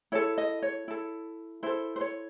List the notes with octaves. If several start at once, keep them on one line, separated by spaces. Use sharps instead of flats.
E4 A4 C#5
D#5
C#5
E4 A4
E4 A4 C5
C5
C#5